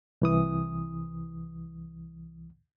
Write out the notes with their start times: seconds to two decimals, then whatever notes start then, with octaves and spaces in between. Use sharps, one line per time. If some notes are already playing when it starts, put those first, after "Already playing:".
0.22 C2 E3 D#6